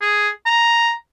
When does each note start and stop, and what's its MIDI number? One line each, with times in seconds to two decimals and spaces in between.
0.01 0.29 68
0.46 0.92 82